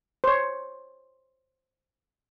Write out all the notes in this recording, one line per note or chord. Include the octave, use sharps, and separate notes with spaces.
C5 C#5